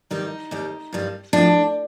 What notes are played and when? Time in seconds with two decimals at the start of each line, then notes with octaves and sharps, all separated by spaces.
0.11 G2 D#3 G3 D#4
0.51 D#2 D#3 G3
0.93 G2 D#3 G3
1.33 A2 F3 D4